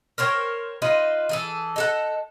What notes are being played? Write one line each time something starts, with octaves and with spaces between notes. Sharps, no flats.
A#4 C5 C#5 G5
D#4 F4 B4 C5
E3 G#4 A4
D#4 A4 F#5